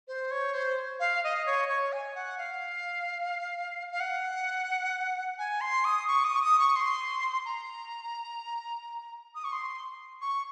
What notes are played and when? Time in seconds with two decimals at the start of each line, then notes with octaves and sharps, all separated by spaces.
0.08 C5
0.31 C#5
0.54 C5
1.00 F5
1.24 D#5
1.46 C#5
1.69 C#5
1.92 G#5
2.15 F#5
2.38 F5
3.91 F5
4.00 F#5
5.38 G#5
5.61 C6
5.85 D#6
6.08 C#6
6.24 D#6
6.36 C#6
6.41 D#6
6.59 C#6
6.76 C6
7.45 A#5
9.35 D#6
9.44 C#6
9.52 C6
10.21 C#6